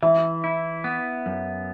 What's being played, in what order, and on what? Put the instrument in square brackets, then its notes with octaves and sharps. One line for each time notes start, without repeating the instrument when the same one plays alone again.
[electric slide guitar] E3 [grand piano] E5
[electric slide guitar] E4
B3
F#2